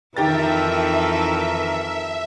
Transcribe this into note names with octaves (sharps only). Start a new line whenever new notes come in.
F2 D#3 E3 G4 A4 A#4 E5 A6